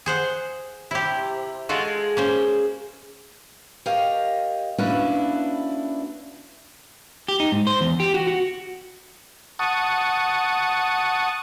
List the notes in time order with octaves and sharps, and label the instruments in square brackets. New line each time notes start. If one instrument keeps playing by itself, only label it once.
[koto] G#4 C5 F#5
[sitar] C3 [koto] E4 G4
[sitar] G#3 [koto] F4 F#4 A4
[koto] A#3 C#4 C5
[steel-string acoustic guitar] G4 A#4 C#5 D#5 F5
A#3 C#4 D4 E4 F#4 B4
[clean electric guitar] G4
D#4
G#2
C5
E2
G4
F#4
F#4
[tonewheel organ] F#5 A5 C#6 D#6